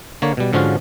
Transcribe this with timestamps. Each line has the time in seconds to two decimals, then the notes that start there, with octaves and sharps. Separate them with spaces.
0.22 D3 A#3 C#5
0.37 B2 G3
0.53 G#2 D3 F3 C#4 F4 F#4